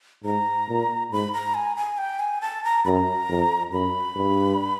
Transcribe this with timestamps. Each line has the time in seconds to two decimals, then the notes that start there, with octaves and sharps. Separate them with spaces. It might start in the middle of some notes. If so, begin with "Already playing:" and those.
0.24 G#2 A#5
0.69 A#2
1.12 G#2 B5
1.33 A#5
1.54 G#5
1.77 G#5
1.98 G5
2.20 G#5
2.41 A5
2.64 A#5
2.85 F#2 A#5 B5
3.29 F2
3.72 F#2 B5
4.16 G2